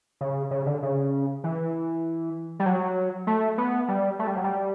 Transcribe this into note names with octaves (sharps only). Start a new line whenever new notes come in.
C#3
C#3
D3
C#3
E3
G3
F#3
A3
B3
G3
A3
G3
F#3
G3